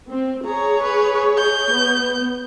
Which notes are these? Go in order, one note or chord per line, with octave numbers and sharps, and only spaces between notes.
C4
G#4 C#5 A#5
B4
G6
B3